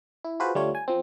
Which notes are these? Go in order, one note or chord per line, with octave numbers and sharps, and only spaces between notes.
E4
F4 F#4 G#4 B4 C5
D2 G3 A3 F4 C#5
G#5
F3 C4